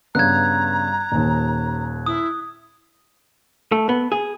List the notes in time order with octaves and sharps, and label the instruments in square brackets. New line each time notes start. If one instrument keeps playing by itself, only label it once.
[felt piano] G2 C#3 B3 [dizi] A#5 [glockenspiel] F#6 G#6
[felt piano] D#1 D#2
[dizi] E4 [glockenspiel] D#6
[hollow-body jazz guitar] A3
B3
G#4